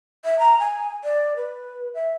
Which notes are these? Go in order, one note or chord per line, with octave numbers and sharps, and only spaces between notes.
E5
A#5
G#5
D5
B4
E5